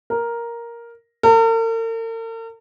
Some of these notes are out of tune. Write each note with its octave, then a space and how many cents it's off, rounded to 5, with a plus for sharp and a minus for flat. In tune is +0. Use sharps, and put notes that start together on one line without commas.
A#4 +5
A#4 -45